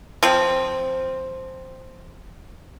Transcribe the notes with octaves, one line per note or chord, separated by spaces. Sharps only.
F3 C4